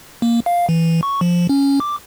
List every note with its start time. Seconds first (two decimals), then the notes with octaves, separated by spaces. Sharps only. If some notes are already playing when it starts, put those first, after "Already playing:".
0.22 A#3
0.46 F5
0.69 E3
1.03 C#6
1.21 F3
1.49 C#4
1.80 D6